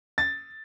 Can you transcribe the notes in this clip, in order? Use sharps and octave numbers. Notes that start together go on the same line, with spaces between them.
A6